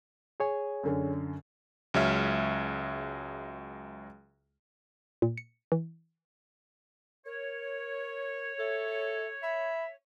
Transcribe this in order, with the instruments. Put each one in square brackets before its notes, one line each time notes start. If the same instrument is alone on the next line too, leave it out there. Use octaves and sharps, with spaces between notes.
[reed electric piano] G#4 C#5 G#5
[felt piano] F#2 D3 C#4
[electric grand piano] C#2 F#3 G#3 C#5 E5 F6
[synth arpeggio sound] A#2
C#7
E3
[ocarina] A#4 [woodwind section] C#5
[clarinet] A4 [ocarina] E5
[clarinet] E5 [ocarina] B5